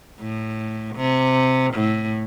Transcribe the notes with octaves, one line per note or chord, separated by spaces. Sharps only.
A2
C3
A2